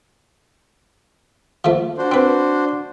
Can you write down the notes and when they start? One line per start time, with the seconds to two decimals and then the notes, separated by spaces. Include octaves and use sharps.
1.65 F3 A3
1.97 D4 F#4 C5
2.12 C4 B4